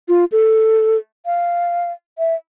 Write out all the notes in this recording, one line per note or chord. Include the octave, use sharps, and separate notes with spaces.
F4
A4
F5
E5